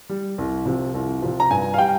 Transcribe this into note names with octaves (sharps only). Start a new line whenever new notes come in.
G3
C2
C3 F3
C2
C3 F3
A#5
G2 G#5
F5
G3 G5